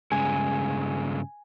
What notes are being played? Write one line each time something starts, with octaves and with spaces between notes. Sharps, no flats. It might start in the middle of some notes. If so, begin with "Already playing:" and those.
G2 C#3 G#3 G#5